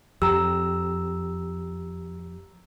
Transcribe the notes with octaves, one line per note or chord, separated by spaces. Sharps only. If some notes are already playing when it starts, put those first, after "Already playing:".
F2 G4 A#5 E6